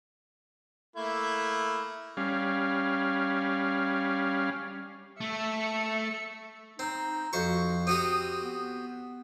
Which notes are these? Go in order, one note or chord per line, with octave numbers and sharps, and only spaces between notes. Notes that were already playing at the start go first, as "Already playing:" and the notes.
A3 A#3 E4
G3 C#4 F5
A3 E5 C#7
C4 D#4
F2 F#4 C5 C#6
C4 F#4 G4 D#6
B3